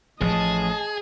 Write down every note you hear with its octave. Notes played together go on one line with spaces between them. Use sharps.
A1 F3 A3 G#4 D#5 A5